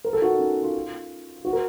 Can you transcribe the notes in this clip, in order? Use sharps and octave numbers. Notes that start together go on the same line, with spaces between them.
A#4
A4
F#4
D#4
C#4
F4
F#4
A#4